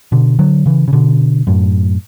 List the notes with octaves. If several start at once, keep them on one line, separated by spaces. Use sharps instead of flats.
B2 D3
D3 F#3
C#3 E3
C#3
B2 D3
F#2 A2